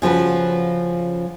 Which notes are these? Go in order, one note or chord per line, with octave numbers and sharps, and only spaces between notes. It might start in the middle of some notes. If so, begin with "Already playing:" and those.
C#3 F3 F#4 B4